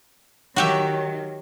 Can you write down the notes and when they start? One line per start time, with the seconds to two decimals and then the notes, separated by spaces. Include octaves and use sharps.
0.56 D#3 F#3 F#4 G4 E5